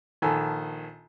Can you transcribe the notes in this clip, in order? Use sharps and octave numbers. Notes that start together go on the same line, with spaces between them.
A#1 D#3 A4 G#5